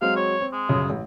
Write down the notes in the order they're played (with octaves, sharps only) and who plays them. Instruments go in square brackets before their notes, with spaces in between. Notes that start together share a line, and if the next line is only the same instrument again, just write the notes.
[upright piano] F#3 G#3 C4 [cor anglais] F5
[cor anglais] C#5
[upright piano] C4
[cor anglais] G#3
[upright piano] G1 F#2 C#3
A1